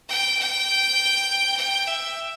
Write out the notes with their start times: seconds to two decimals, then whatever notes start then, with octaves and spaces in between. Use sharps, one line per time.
0.09 G5
0.39 G5
1.56 G5
1.86 E5